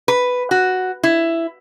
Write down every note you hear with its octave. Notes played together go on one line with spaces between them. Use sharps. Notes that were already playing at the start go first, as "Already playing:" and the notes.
B4
F#4
E4